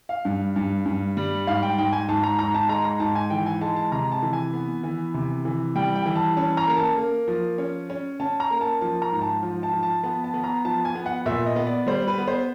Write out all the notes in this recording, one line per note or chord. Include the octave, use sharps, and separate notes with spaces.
F5
G2
G2
G2
G3
G#2 F5
G5
G#2 G5
G#5
G#2 A5
A#5
G#2 A#5
A5
G#3 A#5
A#5
G#2 A5
G#5
E3 G5
G#5
G#3 A5
A5
C3 A#5
A5
E3
G#5
B3
E3
C3
E3
G3 G5
G5
E3
A5
C#4 A5
A#5
A#3
A5
A#3
F3
C#4
C#4
C#4 A5
A#5
A#3
A5
F3 A5
A#5
G#2
A5
F3
A5
F3
A5
B3 A5
A5
B3
A#5
F3 A5
G#5
B3
F#5
A#2 E5
D#5
B3
D5
G3 C5
B4
B3
C5